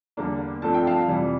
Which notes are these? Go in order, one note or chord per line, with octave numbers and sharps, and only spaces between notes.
E2 D3 G3 A#3 D4
G2 F3 A3 C4 A5
G5
F5 A5
F2 C3 E3 G3